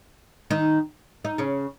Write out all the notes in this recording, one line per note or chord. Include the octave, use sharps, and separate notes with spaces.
D#3 D#4
D#4
C#3 C#4